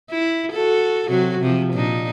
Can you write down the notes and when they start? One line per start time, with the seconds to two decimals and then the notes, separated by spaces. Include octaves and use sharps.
0.10 E4
0.52 F#4 A4
1.09 C3 F#3 F#4
1.41 C3 F3
1.73 A#2 D4 D#4